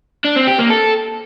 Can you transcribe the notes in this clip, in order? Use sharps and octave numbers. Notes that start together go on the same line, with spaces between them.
D4
C4
G4
A#3
A4